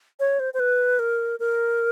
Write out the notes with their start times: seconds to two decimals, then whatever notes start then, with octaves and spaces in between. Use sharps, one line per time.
0.20 C#5
0.40 C5
0.54 C5
0.60 B4
0.99 A#4
1.40 A#4